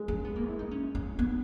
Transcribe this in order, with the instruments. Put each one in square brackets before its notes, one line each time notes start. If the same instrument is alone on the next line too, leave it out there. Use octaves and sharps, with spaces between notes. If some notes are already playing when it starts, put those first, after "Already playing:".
Already playing: [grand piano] G#3
[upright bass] C#4
B3
A#3
E4
D#4
C#4
C#4
B3